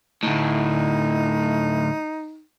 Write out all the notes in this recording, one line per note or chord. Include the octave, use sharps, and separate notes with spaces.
D2 A2 D#4